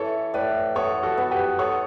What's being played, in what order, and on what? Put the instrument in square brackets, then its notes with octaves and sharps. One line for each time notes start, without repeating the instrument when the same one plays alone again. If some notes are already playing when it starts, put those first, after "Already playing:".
Already playing: [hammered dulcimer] E3 [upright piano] A4 C#5
[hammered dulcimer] A2 [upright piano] B4 D5
[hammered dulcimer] B3 [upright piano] A4 C#5
[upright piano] F#4 A4
[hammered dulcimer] B3
[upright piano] G4 B4
[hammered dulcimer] B3 [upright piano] A4 C#5